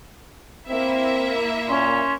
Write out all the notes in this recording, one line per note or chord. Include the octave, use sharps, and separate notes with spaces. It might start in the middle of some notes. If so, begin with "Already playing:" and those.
A#3 C4 E4 E5
A#2 C#4 C6